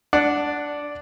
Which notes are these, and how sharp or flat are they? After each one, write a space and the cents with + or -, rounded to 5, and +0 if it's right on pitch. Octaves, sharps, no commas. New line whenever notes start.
D4 -5 F#5 +0